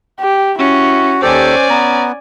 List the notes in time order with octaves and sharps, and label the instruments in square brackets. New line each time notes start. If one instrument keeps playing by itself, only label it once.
[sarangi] G4
[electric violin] C#4 [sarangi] E4 [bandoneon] F#4
[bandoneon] D#2 G4 A4 [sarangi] C#4 [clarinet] C5 [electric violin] D5 G#5
[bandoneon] B3 [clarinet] A#5